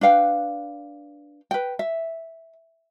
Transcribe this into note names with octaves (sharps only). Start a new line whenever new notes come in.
D4 B4 F5 G5
B4 G5
E5